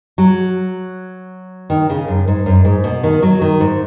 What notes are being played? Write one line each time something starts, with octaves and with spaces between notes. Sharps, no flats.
F#3
D#3
C#3
F#2
G#2
F#2
G#2
B2
D#3
F#3
D#3
G#2